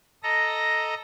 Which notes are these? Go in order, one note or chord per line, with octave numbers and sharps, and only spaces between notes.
A4 D#5 A#5 A#6